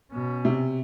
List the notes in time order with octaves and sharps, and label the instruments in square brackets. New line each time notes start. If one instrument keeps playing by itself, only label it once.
[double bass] B2 C#4
[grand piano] C3